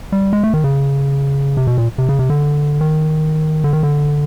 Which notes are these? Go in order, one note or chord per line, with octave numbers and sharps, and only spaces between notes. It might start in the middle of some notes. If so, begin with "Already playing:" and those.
G3
G#3
A3
D#3
C#3
C3
B2
A#2
C3
C#3
C3
D3
D#3
D3
D#3
D3